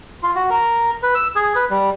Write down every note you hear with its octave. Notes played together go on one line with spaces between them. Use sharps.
F4
F#4
A#4
B4
E6
G#4
B4
G3